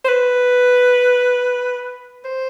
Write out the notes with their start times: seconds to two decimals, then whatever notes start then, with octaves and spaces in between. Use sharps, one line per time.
0.04 C5
0.08 B4
2.24 C5